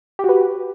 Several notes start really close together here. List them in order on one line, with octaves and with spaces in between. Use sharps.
G4 F#4 B4